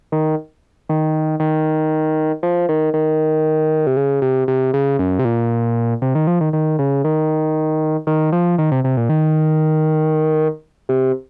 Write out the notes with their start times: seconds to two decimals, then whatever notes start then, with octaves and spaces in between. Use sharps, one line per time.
0.12 D#3
0.89 D#3
1.40 D#3
2.43 F3
2.69 D#3
2.94 D#3
3.87 C3
3.97 C#3
4.22 C3
4.48 C3
4.74 C#3
4.99 F#2
5.19 C3
5.25 A#2
6.02 C3
6.15 D#3
6.27 F3
6.41 D#3
6.53 D#3
6.79 C#3
7.04 D#3
8.07 D#3
8.32 F3
8.58 D#3
8.72 C3
8.84 C3
8.97 A#2
9.09 D#3
10.89 C3